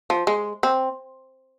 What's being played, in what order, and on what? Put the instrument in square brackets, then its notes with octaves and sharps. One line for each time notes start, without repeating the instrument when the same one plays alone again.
[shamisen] F3
G#3
C4